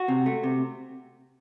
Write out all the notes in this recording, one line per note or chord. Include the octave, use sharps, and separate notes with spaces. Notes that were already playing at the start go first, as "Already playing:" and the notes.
Already playing: F#4
C3
A3
C3